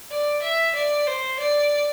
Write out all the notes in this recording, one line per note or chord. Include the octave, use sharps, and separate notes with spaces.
D5
E5
D5
C5
D5